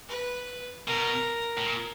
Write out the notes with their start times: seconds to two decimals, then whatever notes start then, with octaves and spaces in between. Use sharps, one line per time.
0.09 B4
0.87 B2 A#4
1.58 A2
1.66 A#2